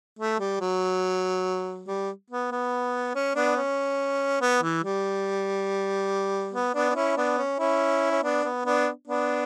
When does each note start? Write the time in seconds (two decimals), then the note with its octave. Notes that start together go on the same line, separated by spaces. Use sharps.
0.19 A3
0.39 G3
0.61 F#3
1.88 G3
2.30 B3
2.52 B3
3.15 C#4
3.35 B3 D4
3.56 C#4
4.41 B3
4.63 E3
4.84 G3
6.53 B3
6.75 B3 D4
6.90 D4
6.95 C#4 E4
7.16 B3 D4
7.38 C#4
7.59 C#4 E4
8.11 C#4
8.23 B3 D4
8.44 B3
8.66 B3 D4
9.07 B3 D4